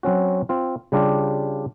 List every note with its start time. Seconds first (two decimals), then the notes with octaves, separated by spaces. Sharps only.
0.03 F#3 C4 C#4 F#4
0.49 C4 F4
0.92 C#3 G3 D4 F4 G4